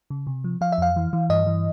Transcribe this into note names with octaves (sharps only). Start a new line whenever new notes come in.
C#3
C3
F3
F3 F5
E5
F2 F5
E3
E3
G2 D#5
E3